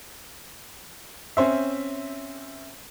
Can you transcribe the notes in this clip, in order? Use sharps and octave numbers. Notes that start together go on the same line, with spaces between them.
C4 C#4 C5 E5